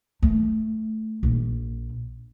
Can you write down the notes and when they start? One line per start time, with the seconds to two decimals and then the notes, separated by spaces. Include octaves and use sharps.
0.22 A3
1.23 A#1